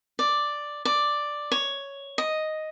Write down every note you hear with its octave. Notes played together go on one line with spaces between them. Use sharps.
D5
D5
C#5
D#5